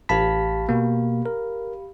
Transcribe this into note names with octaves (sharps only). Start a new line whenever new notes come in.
A1 G4 F5 A5 B5 B6
B2 A#3
A#4